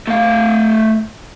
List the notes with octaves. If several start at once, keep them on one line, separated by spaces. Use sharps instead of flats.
A3 F5